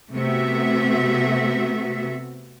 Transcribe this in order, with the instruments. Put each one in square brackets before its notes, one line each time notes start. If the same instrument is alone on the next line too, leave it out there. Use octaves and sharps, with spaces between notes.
[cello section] C3 A3 B3 F#4 E5